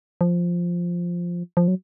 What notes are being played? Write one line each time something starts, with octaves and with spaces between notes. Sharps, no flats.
F3
F3
F#3